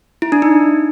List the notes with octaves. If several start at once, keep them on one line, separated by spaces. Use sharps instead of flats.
E4
D4
D#4